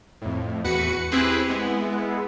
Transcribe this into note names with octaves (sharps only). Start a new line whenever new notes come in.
F2 A2
E2 F#4 B4 C#7
C4 E4 G4 G#4 B4
G#3 B3 E4